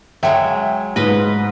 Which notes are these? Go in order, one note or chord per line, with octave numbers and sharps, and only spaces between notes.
F#3 G#3 E5 G5
G#2 B4 D#5